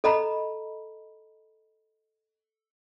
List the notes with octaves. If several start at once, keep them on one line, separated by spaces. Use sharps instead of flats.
A4 D#5 A#5 B5